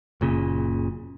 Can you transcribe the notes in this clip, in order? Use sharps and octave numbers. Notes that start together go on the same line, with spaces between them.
F#1 A#2 C#3